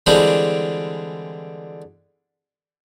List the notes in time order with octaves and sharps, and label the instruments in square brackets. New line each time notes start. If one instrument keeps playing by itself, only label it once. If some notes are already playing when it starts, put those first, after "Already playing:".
[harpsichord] D3 E3 G3 G#3 C4 D4